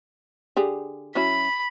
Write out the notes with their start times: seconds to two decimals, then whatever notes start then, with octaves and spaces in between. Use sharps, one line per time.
0.57 D3 G4 G#4
1.15 F#3 C#4 E4 B5